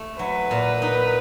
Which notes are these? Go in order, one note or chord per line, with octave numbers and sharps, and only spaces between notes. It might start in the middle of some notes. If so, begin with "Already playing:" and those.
Already playing: A3
F#3 B4
A#2
D#4